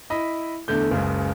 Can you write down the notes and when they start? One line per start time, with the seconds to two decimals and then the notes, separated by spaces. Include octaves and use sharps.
0.10 E4 D#5 B5
0.68 E2 D3 A3 G6
0.91 F#1 C#2 C#3